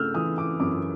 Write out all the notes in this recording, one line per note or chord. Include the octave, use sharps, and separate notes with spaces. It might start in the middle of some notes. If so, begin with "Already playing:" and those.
Already playing: C#3 A3 E6 F6 G6
E3 D#6
D6
F#2 D6